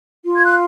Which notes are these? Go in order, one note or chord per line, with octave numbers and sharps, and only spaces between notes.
F4
G#6
F#6